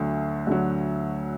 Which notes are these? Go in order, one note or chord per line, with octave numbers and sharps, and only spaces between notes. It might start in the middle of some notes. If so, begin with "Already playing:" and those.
Already playing: D2 D3 F#3
D2 D3 F#3